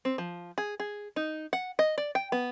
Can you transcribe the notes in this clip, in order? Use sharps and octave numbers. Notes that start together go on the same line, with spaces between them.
C4
F3
G#4
G#4
D#4
F#5
D#5
D5
G5
B3